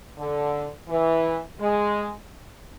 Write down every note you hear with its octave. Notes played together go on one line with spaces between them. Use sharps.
D3
E3
G#3